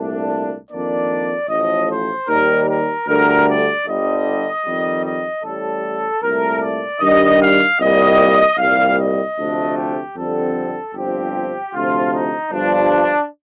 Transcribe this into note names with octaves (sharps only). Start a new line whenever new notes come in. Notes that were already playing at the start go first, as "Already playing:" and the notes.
Already playing: C2 A#2 A3 D4
F2 D#3 A#3 D4 D5
A1 A2 F3 D#5
C5
D#2 D#3 G3 A#4
A#4
D2 D3 G3 A#4
D5
G1 G2 D3 G3 D#5
F2 D#3 G3
D#5
A1 A2 G3 A4
C2 A#2 A3 A#4
D5
G2 D#3 G3 D#5
F5
C2 A#2 G3 D#5
C2 A#2 G3 F5
D#5
D2 C3 F3 A3 D4
G4
F2 D3 G3 C4 A4
G1 G2 F3 C4 G4
D2 C3 F3 F4
D#4
G1 G2 F3 D4